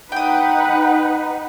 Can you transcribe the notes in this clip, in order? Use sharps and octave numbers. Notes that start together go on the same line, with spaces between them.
D#4 B4 F#5 G5 D#6